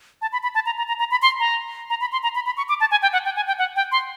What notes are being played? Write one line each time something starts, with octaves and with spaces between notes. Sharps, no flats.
A5
B5
B5
A5
A#5
A#5
A#5
A#5
B5
C6
A#5
A#5
B5
C6
A#5
B5
B5
C#6
D6
A5
G#5
G5
F#5
G5
G#5
G5
F#5
G5
C6